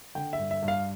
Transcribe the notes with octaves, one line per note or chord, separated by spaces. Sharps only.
D3 G5
E5
G2
E5
G2
F5